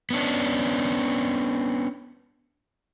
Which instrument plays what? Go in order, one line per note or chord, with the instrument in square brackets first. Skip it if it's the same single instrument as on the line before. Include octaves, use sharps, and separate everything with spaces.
[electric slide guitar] B3 C#4 D4